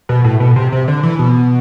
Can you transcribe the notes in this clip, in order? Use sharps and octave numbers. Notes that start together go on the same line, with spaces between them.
B2
A2
B2
C3
C3
D3
E3
B2